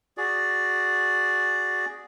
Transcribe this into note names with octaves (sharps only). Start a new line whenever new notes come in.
F#4 G#4 D5